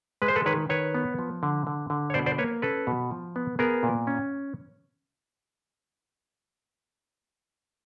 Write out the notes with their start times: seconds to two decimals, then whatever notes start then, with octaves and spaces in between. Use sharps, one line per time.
0.22 G#3 B4
0.28 C5
0.36 A4 B4
0.46 D#3 B4 C#5
0.69 D#3 B4 C#5
0.95 B3
1.19 F3
1.43 D3
1.67 D3
1.90 D3
2.10 C#5
2.14 B2 C5 D5
2.26 C5 D5
2.38 A#3 B4 C#5
2.62 C#4 A4 B4
2.87 B2
3.11 F3
3.36 B3
3.59 B3 G#4 A#4
3.83 A#2
4.07 C#4